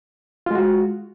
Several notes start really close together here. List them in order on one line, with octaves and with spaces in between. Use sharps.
F4 G#3 F#4